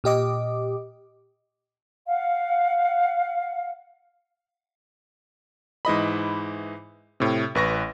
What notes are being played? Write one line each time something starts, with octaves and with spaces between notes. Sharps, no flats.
A#2 G4 D#5 D6
F5 F#5
G#2 E3 D#5 B5
A2 C3
A1 B4 C#6 A#6